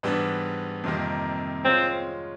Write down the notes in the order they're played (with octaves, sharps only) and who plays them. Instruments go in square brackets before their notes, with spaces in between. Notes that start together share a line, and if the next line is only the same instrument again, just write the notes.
[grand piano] G#2 E3 G3 B3 D4
F2 C3 D#3 G3 A#3
[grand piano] G#3 C#4 F4 [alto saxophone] C4